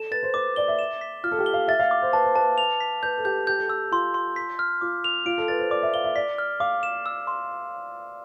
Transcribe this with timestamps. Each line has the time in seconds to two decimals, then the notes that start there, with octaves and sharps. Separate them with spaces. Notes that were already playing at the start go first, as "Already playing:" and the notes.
Already playing: A4 E7
0.11 B4 A6
0.23 C5
0.34 B4 D6
0.56 D5 G7
0.68 E5
0.79 E7
1.01 B6
1.24 F4 F6
1.32 A4
1.39 G4
1.46 G7
1.54 F5
1.68 E5 A6
1.79 F5
1.91 D6
2.02 C5
2.13 B4 A5
2.24 C5
2.36 B4 A5
2.58 F7
2.80 B6
3.03 B4 G6
3.18 A4
3.25 G4 G6
3.47 G4 G6
3.58 A4
3.68 G4 E6
3.92 F4 C6
4.14 C6
4.36 B6
4.59 F6
4.81 F4 D6
5.04 F7
5.26 F4 D7
5.38 A4
5.48 B4 A6
5.59 C5
5.70 D5 D6
5.83 E5
5.94 F5 G7
6.04 E5
6.16 D5 B6
6.38 F6
6.60 F5 D6
6.83 E7
7.06 E6
7.27 C6